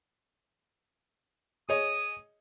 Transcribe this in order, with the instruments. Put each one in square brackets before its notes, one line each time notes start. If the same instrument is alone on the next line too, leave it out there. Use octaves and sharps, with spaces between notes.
[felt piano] G#4 C#5 D#5 [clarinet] D#6